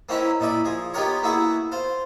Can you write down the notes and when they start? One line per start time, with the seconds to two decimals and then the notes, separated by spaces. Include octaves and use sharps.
0.09 A#3 C4 C#4 D#4 E4 B4
0.40 A#2 D#4 E4 D5 B5
0.65 F3 G#4
0.94 B3 D#4 F4 G4 A#4 C#5
1.23 A#3 B3 E4 F#4 G#4
1.72 F4 C5